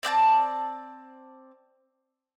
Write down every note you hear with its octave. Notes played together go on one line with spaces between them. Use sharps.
C4 D5 G5 A5